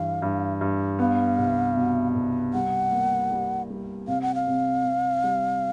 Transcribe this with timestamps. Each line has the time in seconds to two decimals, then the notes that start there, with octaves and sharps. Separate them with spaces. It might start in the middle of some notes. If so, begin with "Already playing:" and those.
Already playing: G2 E3 F5
0.22 G2
0.61 G2
0.99 B3 F5
1.39 C2
1.76 B2
2.16 C2
2.54 G3 F#5
2.92 A#3
3.31 G3
3.70 G3
4.08 C3 F5
4.22 F#5
4.35 F5
4.47 C3
4.85 C3
5.24 G3